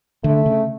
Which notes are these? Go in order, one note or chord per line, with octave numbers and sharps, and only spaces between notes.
D3 A3
C#3